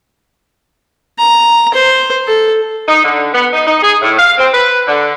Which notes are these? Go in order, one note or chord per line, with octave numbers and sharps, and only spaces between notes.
A#5
C5
A4
D#4
D3
B3
D#4
D#4
G#4
A2
F5
C4
B4
D3